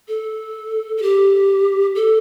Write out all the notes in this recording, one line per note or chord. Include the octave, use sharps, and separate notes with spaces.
A4
A4
G4
A4